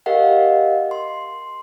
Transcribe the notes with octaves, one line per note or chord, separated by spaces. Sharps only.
G4 A#4 D#5 F5 F#5
C6